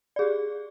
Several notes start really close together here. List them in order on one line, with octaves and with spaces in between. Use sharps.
D5 G#4 G4